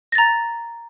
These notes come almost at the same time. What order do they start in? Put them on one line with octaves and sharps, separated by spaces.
A#6 A6 A#5